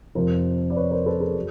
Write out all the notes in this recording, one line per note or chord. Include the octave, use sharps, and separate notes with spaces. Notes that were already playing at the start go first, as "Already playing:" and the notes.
F2 C3 F3 A#4 C5
D5
B4 C#5
A#4 C5
A4 B4
G#4 A#4
F#3